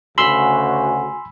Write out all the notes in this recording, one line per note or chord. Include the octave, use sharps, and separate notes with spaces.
D2 C#3 F#4 G#5 B5 C6 E6